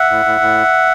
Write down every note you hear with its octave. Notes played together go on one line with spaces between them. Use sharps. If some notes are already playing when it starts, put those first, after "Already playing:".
Already playing: E5 F#5
A2
A2
A2